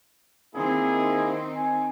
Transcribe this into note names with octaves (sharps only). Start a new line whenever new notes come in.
D#3 A#3 C4 D#4 E4 G#4
G#5